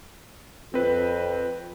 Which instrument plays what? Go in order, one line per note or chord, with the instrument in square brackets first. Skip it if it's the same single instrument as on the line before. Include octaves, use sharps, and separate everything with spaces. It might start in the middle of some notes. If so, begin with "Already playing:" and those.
[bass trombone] F2 [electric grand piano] C4 B4